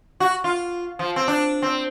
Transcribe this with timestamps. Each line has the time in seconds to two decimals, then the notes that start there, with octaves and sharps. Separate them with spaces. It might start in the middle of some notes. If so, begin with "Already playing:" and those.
0.20 F#4
0.44 F4
0.99 F3
1.16 C4
1.28 D4
1.62 C4